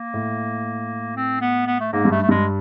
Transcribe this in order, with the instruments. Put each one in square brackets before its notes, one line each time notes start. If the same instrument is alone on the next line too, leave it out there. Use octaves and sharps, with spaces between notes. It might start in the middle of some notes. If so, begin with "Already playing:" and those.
Already playing: [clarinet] A#3
[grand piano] A2
[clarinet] C4
B3
B3
A3
[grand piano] G#2 [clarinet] A#3
[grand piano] G2
[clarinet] A3
A3
[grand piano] G2 [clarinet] G#3